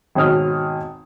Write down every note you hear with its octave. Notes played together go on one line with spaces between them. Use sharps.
G#1 B2 C#5 D#6 F6